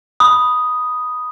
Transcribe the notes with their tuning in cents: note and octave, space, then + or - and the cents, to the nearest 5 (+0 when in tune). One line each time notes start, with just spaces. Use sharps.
B5 +0 D#6 +0